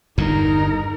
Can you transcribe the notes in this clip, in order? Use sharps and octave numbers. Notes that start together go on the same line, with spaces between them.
G1 E2 G2 D#4 A#4